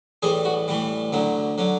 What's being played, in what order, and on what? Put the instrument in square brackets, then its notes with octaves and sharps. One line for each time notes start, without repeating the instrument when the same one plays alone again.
[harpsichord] A2 E3 G3 G#4
F#4
A2 E3 G3
D2 D3 F#3
D3 F#3